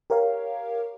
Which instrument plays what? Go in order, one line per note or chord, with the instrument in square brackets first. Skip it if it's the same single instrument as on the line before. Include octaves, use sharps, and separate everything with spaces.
[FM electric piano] G4 A#4 C#5 F5